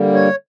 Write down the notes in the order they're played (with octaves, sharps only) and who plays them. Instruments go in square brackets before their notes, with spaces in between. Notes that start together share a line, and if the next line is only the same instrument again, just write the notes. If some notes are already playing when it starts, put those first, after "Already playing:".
Already playing: [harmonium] D3 G3 A#3
C#5